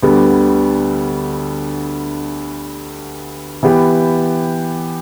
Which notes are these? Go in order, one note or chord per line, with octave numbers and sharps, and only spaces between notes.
D2 D3 G3 B3
E3 B3 G4